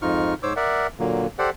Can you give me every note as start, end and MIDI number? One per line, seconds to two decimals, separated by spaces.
0.02 0.34 41
0.02 0.34 44
0.02 0.34 63
0.02 0.34 65
0.02 0.34 85
0.02 0.34 89
0.43 0.53 44
0.43 0.53 72
0.43 0.53 73
0.43 0.53 86
0.43 0.53 88
0.56 0.87 70
0.56 0.87 74
0.56 0.87 76
0.56 0.87 78
0.99 1.27 46
0.99 1.27 50
0.99 1.27 54
0.99 1.27 58
1.39 1.50 67
1.39 1.50 69
1.39 1.50 72
1.39 1.50 74
1.39 1.50 78